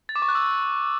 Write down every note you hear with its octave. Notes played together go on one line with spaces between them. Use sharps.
A6
D6
C#6
F#6
E6